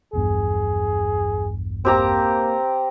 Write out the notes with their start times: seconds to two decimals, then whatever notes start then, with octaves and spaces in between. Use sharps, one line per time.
0.13 A#1 E2 G2 G#4
1.85 A#3 C4 G4 A#5